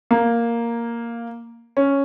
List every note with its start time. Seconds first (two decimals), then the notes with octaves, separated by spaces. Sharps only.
0.11 A#3
1.77 C#4